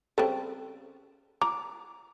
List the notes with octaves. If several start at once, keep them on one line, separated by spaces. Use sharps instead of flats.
C#3 G3 C4 A4
A#5 D6